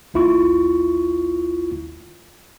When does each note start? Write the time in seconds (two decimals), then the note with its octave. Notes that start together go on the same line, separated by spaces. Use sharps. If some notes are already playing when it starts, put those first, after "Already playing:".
0.14 A1 D#2 E4 F4 C#6